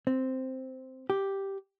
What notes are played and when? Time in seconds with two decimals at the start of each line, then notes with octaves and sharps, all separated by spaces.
0.07 C4
1.10 G4